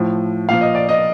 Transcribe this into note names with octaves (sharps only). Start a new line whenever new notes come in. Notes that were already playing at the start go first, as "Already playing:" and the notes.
Already playing: A2 F3
A#2 F3 F5
D#5
D5
D#5